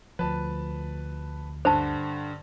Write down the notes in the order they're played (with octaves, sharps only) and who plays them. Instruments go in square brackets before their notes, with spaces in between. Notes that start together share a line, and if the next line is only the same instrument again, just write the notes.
[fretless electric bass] D2 F3 [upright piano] B4 A5
[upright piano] G2 D3 [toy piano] C5 A5